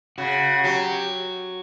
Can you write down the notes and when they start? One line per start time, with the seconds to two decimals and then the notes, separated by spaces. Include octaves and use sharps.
0.18 C#3 F#4
0.64 F#3 G4